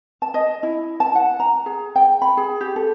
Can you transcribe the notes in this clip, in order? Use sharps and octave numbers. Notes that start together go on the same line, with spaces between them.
A5
D#5
E4
A5
F#5
A#5
G#4
G5
B5
G#4
G4
A4